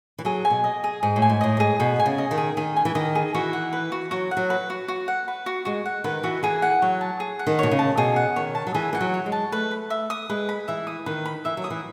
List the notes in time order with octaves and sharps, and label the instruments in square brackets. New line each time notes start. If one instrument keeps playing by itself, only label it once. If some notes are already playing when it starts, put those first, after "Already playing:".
[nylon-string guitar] E3
[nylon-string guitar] F#3 [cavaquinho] G#4
[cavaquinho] G#5
[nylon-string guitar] B2
[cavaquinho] D#5
G#4
[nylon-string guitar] G#2 [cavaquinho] G#4
[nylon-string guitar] A2
[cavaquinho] G#5
[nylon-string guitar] G#2
[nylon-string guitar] A2 [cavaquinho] D#5
[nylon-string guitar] G#2 [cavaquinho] G#4
[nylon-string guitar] B2 [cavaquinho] G#4
[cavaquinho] G#5
[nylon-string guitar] C#3
[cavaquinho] D#5
[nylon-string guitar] D#3
[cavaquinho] G#4
[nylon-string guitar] D#3 [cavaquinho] G#4
[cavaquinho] G#5
[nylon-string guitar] E3
[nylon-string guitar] D#3 [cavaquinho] D#5
[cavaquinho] G#4
[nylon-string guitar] E3 [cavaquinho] F#4
[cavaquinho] F#5
B4
F#4
[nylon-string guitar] F#3 [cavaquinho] F#4
[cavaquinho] F#5
[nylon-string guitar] F#3
[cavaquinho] B4
F#4
F#4
F#5
B4
F#4
[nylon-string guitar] G#3 [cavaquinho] F#4
[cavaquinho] F#5
[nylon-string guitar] D#3 [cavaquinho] B4
[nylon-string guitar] E3 [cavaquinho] F#4
[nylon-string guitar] E3 [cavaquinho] G#4
[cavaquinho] F#5
[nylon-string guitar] F#3 [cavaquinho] C#5
[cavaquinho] A5
G#4
F#5
[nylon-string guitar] D#3
[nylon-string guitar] B2 [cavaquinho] C#5
[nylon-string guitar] C#3
[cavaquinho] A5
[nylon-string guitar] B2 [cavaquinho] G#4
[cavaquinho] F#5
[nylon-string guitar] D#3 [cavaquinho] C#5
[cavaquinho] A5
[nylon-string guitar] F#3
[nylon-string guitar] E3 [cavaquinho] G#4
[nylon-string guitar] E3 [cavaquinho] F#5
[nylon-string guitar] F#3
[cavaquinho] C#5
[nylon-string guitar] G#3
[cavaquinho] A5
[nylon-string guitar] A3 [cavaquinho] B4
[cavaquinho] B5
E5
D#6
[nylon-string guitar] G#3 [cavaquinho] B4
[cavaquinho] B5
[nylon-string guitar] E3 [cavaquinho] E5
[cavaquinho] D#6
[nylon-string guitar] D#3 [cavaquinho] B4
[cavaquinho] B5
[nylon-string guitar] E3 [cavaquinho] E5
[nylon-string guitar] F#3
[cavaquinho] D#6
[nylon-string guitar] E3